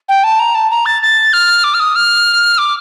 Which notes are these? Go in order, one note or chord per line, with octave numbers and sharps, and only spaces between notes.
G5
A5
A#5
A5
A#5
A6
A6
F6
D6
F6
D#6
F6
D6